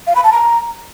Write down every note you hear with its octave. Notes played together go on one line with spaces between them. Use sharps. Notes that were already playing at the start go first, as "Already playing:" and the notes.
F5
B5
A5
A#5